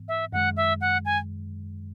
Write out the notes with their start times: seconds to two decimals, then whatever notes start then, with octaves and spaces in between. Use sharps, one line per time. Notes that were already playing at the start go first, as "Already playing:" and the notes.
Already playing: G#2 E3 B3
0.08 E5
0.32 F#2 D#3 G#3 F#5
0.57 E5
0.81 F#5
1.05 G#5